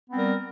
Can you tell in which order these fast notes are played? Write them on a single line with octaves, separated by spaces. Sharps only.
B3 C4 G3 A#4